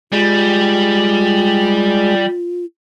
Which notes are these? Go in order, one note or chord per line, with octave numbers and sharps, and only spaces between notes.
G3 G#3 F4